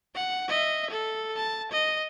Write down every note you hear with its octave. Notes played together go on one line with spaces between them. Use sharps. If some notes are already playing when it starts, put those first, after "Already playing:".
F#5
D#5 E5
A4
A5
D#5